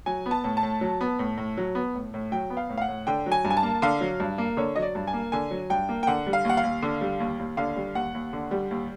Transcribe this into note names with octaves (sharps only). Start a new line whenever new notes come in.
F#3 G#5
B3
A5
A2
A5
A2
F#3
B3
A2
A2
F#3
B3
A2
A2
F#3 G5
B3
F5
A2
F5
F#5
A2
D3 G5
F#3
G#5
G2
G#5
A5
A#3
D3 F5
F#3
G2
A#3
D3 C#5
F#3 D#5
D5
G2
G#5
A#3
D3 G#5
F#3
G2 G5
A#3
G5
D3 F#5
G3
F5
D#2 F#5
F5
D#2
D3
G3
D#2
D#2
D3 F5
G3
D#2 F#5
D#2
D3
G3
D#2